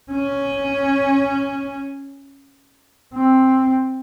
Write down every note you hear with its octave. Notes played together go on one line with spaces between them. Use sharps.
C#4
C4